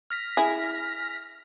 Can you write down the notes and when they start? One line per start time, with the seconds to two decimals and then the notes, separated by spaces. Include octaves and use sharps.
0.10 F6 A#6 B6
0.37 E4 G#4